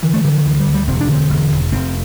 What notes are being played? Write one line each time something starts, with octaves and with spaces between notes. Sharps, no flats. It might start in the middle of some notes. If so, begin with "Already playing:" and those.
D3 E3
A3
D3 G3
F3
D2 E3
G3
D2
G3
E1 C4
D4
D3 C4
E1
E1
F1 C4